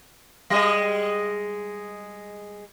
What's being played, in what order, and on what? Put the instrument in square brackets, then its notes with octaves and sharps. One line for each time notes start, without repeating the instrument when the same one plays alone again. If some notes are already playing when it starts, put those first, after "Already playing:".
[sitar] G3 G#3 D#5